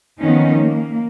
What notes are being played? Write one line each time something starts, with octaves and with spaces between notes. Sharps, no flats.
D#3 F3 B3 C#4 D#4
A#3